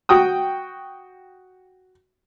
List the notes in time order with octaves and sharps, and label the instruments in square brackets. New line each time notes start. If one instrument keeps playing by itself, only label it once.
[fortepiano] F#4 G5 D#6